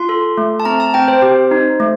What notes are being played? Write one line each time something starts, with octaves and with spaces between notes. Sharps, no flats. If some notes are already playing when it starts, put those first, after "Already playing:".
Already playing: F4 C6
A4
A3
A5
C4 A#5
A5
C4 G5
C5
G4
D#4
A3